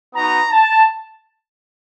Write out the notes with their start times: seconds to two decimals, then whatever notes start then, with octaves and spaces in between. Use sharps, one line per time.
0.14 B3 D#4 F#4 A#5
0.51 A5